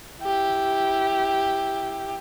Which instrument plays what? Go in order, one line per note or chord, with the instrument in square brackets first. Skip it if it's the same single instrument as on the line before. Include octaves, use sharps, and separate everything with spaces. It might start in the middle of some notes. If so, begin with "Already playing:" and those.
[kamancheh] E4 G4